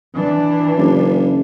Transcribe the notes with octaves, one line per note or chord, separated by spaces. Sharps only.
E3 D4
F#1